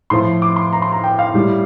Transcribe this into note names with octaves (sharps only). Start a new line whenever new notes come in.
A2 F3 C6
D6
C6
A#5
C6
A#5
G5
F5
A2 G3